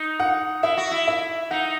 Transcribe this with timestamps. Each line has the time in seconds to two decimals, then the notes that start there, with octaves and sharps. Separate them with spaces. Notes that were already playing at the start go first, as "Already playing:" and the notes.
Already playing: D#4
0.20 F#5
0.63 E4 E5
0.77 F#4
0.91 E4
1.07 E5
1.51 D#4 F#5